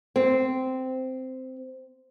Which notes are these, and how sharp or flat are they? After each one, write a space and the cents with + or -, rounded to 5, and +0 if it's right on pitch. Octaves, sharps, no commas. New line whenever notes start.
C4 -10